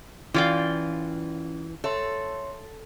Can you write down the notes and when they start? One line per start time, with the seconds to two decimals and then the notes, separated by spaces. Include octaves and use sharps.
0.34 E3 C#4 F4 D5 G5
1.84 A4 C#5 E5 C6